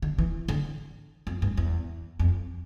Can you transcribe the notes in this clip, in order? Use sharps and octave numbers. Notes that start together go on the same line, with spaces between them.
D3
E3
D3
F2
G2
E2
F2